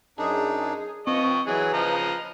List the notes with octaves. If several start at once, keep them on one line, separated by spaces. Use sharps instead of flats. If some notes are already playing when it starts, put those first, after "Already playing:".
F#2 D4 D#4 G#4
F3 C4 D#5 C#6
E3 F#3 G#4 B4
C#3 F3 D#5 A#5